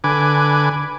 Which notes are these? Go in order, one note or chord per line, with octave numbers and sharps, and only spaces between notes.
D3 B4 G#5 D6